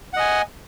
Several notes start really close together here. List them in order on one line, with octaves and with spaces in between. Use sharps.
F#5 D#5 G#5